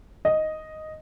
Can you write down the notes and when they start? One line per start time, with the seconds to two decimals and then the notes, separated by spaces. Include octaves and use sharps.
0.25 D#5